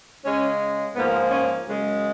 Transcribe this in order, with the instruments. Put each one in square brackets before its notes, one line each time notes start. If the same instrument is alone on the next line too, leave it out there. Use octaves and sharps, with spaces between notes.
[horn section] C#3 G#3 C#4
G#2 F3 A#3 B3
C#4
F#2 C#3 G#3